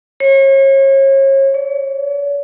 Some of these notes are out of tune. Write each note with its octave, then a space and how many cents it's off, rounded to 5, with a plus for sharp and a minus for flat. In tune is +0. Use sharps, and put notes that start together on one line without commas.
C#5 -35
C#5 +45